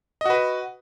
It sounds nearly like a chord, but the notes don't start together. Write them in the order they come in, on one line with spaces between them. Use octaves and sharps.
D#5 F#4 B4